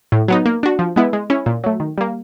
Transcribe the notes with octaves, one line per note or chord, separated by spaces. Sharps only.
A2
F#3 B3 D#4
A#3
D4 F#4
F3
G#3 B3 E4
G#3
C#4 E4
A#2
F#3 A3
D#3
G3 A#3